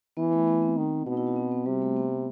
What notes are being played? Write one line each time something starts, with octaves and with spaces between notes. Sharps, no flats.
E3 B3
A3
B3
C4
D#3
B2 D#4
E4
F#4
C4
B3
C3 G3
A3
B3